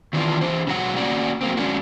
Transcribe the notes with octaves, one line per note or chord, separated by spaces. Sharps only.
D#3 E3 B3 D4 F4
E3 D4 C5
B2 F#3 G#3 F#5
A#3 C#4 F#4 D5 F#5
F#3 A#3 C4
G#3 C#4 D4 F#4